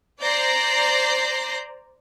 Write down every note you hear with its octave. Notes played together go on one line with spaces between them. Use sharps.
C5 D5 A#5 G6 A#6 C7